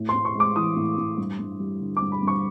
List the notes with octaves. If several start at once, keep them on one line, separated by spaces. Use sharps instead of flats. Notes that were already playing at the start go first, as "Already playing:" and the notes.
Already playing: A2
C6
A2
C#6
G#3 D6
E3 D#6
A2
A2
G2
G2
G3
D3
D6
G2
B5
G2
C#6